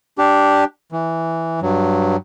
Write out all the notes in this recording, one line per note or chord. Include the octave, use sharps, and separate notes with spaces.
D4 G4
E3
G2 F#3